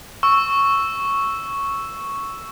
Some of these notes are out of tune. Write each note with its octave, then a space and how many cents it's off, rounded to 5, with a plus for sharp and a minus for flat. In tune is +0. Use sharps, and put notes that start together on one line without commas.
C#6 +0 E6 +0